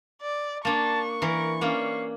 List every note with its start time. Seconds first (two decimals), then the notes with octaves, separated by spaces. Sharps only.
0.21 D5
0.65 A#3 D4 A5 C#6
1.22 E3 A#4
1.61 A#3 C#4 D4 F5